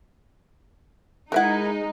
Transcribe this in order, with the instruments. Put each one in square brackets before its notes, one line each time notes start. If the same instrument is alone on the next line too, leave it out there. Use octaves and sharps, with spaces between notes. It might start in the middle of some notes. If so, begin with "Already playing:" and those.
[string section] G#3 D#4 [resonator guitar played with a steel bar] E4 A#4 [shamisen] B4 E5 F#5